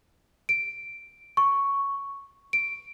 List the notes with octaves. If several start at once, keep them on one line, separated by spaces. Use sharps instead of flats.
D7
C#6
D7